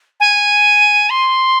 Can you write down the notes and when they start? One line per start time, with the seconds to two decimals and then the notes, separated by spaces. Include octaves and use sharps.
0.20 G#5
1.10 C6